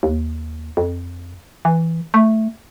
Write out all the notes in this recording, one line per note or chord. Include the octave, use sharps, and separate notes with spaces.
D#2
F2
E3
A3